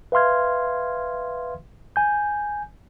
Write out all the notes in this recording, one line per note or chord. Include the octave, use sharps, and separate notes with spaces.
B4 E5 F5 C6 F6 G#6
G#5 G6